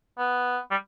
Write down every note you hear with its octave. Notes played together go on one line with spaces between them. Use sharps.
B3
G3